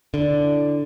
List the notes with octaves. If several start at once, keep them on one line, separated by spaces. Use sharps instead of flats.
D3 D4 E4